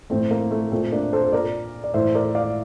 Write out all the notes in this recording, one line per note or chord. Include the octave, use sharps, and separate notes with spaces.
A2 E3 A3 C4
A#3
A3
A#2 A3 C4
A#3 D4
A4 C5
A#2 A#4 D5
D5
A2 E3 C5 E5
A#4 D5
D5 F5